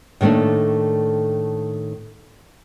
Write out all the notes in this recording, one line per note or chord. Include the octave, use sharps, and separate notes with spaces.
A2 D#3 A3 A#3 D4